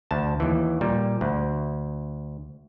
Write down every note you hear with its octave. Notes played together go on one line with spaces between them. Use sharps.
D2 A5
D#2 E3
A#2 G3
D2